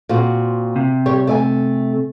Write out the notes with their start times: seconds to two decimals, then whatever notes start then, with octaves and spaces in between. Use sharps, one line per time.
0.09 A#2 C4 F#4
0.76 C3
1.06 G3 G4 C#5
1.27 A3 D5 G#5